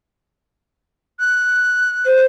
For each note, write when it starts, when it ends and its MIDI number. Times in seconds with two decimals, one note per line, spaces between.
1.19 2.20 90
2.06 2.26 72